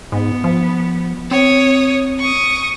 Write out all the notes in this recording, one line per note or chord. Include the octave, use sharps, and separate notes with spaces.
G#2 B3
F3
C4 C#5 D#6
C#6 D#6